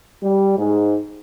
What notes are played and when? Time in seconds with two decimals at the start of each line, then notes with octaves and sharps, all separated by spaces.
0.23 G3
0.58 G#2